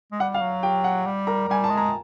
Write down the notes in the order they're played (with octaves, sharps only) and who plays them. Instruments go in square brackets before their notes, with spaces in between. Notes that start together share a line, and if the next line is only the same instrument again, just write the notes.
[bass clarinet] G#3
[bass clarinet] G3 [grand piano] F#5
[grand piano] F5
[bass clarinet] F#3
[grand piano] G4 G5
F#5
[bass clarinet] G3
[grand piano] A#4 A#5
[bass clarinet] G3 [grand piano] G#5
[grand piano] A5
[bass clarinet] G#3
[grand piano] A#5